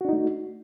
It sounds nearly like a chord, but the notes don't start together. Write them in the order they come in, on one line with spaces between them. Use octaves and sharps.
F#4 D4 D#4 A3